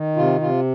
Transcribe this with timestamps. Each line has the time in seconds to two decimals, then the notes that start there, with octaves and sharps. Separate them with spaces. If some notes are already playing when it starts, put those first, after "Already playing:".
Already playing: D#3
0.16 C3 F4
0.41 C3 F4